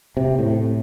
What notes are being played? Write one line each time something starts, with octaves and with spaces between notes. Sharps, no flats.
C3
A2